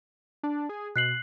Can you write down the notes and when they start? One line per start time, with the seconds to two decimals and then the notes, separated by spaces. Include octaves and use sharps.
0.43 D4
0.69 G#4
0.96 B2 F#6 C7 F#7